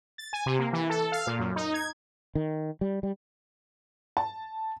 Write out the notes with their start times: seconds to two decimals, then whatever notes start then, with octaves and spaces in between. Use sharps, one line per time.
0.18 A6
0.33 G#5
0.46 C3
0.59 A#3
0.73 E3
0.90 A4
1.12 F5
1.27 A#2
1.39 F#2
1.56 D#4
1.74 G#6
2.35 D#3
2.81 G3
3.03 G3
4.17 A5